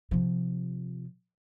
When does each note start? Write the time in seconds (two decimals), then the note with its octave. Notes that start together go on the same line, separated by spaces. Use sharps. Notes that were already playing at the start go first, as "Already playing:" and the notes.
0.11 C3 F3